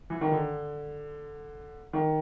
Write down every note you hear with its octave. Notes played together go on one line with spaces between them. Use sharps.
E3
D#3
D3
D#3